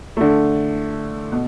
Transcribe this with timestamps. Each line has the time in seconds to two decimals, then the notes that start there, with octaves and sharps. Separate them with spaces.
0.17 D3 A3
1.32 B2